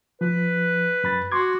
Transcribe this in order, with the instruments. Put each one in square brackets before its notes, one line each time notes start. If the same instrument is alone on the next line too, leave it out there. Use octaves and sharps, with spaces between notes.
[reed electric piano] F3 [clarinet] B4
[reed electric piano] F#2 B5 A6
[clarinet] F#4 [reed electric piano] C6 D6 G#6